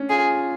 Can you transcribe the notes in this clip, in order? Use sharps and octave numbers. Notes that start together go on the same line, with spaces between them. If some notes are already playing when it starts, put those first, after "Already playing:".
Already playing: C#4 D4
F4 G#4